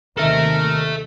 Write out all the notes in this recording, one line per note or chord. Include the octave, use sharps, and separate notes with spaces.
D#2 C3 D#3 A4 A#4 E5